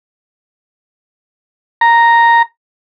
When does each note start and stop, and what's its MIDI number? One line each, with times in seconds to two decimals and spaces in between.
1.81 2.42 82